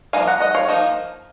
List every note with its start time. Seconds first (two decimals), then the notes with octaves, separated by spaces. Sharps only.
0.13 F3 A#3 D#4 F5 G#5
0.27 F#5 A#5
0.40 D#5 F#5
0.55 C#5 F5
0.68 F3 A#3 D#4